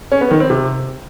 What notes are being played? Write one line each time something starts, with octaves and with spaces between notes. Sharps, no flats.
C#4
B3
D#3
C4
C3